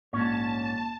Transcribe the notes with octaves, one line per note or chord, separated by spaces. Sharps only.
A#1 G#2 C#4 C#5 A5